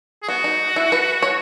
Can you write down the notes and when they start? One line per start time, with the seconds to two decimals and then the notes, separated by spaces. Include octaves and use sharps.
0.23 G#4
0.28 B3 F#4
0.44 D#4
0.76 E4
0.92 B4
1.22 C#5